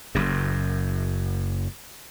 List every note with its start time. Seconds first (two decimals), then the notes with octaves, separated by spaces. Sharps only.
0.15 F#1 F#2